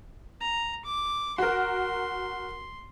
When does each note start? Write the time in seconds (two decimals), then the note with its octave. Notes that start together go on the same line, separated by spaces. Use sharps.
0.41 A#5
0.85 D6
1.38 F#4 A#4 C6